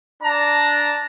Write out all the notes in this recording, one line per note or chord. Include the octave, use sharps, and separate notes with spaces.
D4 D5 A5 A#5